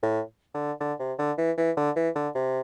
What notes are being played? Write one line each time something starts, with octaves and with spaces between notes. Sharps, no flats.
A2
D3
D3
C3
D3
E3
E3
D3
E3
D3
C3